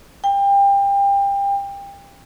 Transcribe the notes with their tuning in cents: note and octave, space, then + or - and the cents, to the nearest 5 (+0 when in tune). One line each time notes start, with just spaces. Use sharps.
G5 +30